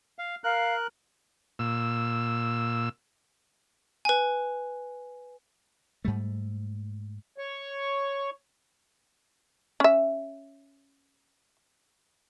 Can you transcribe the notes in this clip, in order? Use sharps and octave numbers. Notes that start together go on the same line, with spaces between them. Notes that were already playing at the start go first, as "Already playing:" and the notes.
F5
A#4 F5 F#6
A#2 E6
B4 G#5
G#2 G3 A3
C#5 C#6
C#4 E5